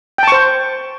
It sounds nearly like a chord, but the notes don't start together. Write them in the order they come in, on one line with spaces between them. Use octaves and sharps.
G5 A5 C#6 C5